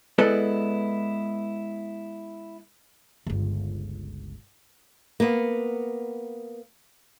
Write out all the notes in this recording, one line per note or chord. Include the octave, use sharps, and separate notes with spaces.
G#3 B3 E4 A4 B4 D5
G1 C#2
A#3 B3